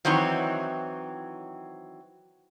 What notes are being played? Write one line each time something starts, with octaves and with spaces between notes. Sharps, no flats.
D#3 E3 F#3 C4 C#5